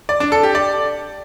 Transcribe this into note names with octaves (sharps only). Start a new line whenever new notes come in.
D5
D4
A4
G4
D5